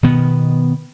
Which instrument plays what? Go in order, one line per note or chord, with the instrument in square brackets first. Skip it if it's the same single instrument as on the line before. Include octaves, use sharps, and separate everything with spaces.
[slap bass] B2 D#3 B3